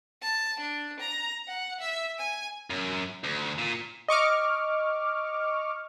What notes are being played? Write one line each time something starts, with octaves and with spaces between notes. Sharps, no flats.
A5
D4
A#5
F#5
E5
G#5
F#2
D2
A#2
D#5 C#6 D6 F6